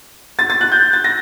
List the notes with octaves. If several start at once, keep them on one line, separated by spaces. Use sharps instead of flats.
A6
A6
F#6
G6
A6
A#6